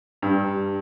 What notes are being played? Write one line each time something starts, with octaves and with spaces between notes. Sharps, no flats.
G2